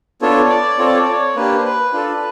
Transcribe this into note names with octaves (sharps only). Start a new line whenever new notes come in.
B3 D4 F4 A4 C#5
D5
C4 F4 A4 C#5
D5
C#5
D5
C#5
A#3 D4 G4 B4
C5
B4
D4 F4 A4